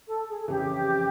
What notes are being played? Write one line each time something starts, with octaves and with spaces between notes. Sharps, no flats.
A4
G#4
F2 C#3 E3 G4